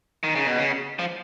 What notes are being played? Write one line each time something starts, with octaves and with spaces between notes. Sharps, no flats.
D#3
C#3
B2
C#3
F3